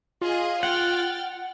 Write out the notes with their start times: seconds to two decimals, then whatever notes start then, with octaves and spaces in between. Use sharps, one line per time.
0.21 F4 G#4 D#5
0.63 F#5 G5 F6 A6